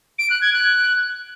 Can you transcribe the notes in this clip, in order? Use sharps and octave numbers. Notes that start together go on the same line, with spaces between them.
D7
F#6
G#6
F#6